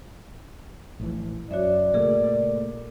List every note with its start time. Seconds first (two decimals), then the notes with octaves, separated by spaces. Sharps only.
1.00 A#1 A2 E3
1.51 F#2 F#4 C#5 D5 E5
1.94 A#2 C#3 A3 G#4 A#4